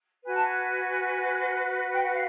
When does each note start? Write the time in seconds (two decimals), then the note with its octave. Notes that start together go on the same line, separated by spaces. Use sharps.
0.23 F#4 B4 G#5
0.33 A5
0.43 G#5
1.93 G5
2.02 F#5
2.11 F5